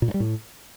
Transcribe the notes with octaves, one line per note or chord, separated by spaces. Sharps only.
A#2
G2
G3
A2